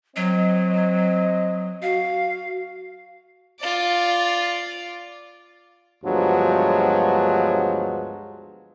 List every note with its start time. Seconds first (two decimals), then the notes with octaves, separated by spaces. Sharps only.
0.16 F#3 C4 D#5
1.82 F#4 F5
3.60 F4 D5
6.04 D2 G2 F3 F#3 G#3 B3